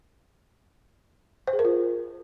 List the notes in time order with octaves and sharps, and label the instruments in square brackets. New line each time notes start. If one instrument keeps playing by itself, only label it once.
[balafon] C5
G#4
A#4
F4